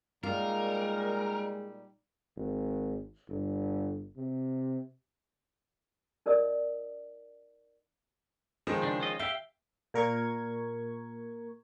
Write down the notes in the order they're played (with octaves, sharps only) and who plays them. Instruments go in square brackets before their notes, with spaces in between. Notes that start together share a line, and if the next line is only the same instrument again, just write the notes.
[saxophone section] A#2 G3 D#4 [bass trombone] G#3 [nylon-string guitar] F4 [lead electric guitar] A#4
[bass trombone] G#1
G1
C3
[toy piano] D#4 A#4 D5 D#5 D#6
[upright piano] D#3 F3 G#3
[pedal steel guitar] C#3 D4
C#4 F4 D#5
[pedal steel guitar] G4 F5 G5 [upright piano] E5
[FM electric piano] A#2 A#4 C#6 G#6